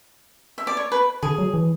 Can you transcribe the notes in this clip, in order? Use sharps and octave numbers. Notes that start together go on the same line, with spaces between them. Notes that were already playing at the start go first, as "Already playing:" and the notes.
E5
D5
C#5
B4
D3 G#4
F#3
E3